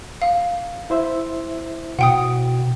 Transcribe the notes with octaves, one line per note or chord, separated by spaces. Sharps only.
F5
E4 C5 E5
B2 F#5 G5 D#6